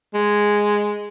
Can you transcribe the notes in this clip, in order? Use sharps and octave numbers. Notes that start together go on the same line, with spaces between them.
G#3